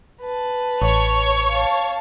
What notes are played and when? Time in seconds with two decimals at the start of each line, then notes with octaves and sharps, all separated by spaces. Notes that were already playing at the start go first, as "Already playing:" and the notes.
0.20 B4 A5
0.82 A1 C#5 C#6
1.49 F5 A5